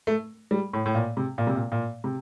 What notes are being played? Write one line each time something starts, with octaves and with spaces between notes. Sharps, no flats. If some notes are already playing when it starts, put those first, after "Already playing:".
A3
G3
A2
A2
A#2
C3
A#2
C3
A#2
A#2
C3